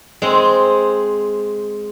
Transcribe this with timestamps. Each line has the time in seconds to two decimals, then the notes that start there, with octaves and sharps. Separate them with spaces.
0.22 G#3 C4